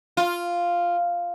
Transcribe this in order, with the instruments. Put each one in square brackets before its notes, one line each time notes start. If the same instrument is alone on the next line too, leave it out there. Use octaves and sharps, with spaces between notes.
[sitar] F4